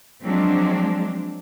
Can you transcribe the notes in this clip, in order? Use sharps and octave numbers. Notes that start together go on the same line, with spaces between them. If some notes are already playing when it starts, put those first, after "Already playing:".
F3 F#3 G#3 C4 D4